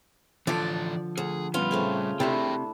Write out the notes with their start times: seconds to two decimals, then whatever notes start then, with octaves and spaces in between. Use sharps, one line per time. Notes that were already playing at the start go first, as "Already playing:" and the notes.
0.47 D3 E3 F3 A4 D5
1.18 D2 G#4
1.54 G3 B3 C#4 F4
1.71 C#3 A3 C4
2.20 C3 A3 D4 E4 G#4 E5 G5